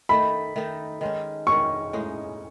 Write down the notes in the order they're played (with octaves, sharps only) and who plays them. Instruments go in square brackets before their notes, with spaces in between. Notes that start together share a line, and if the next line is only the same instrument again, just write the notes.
[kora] D#3 A3 D#4 A4 [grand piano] B5
[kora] D#3 A3 D#4 A4
D#3 G#3 C#4
[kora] D#3 G#3 C#4 [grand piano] C#6
[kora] A2 G#3 D#4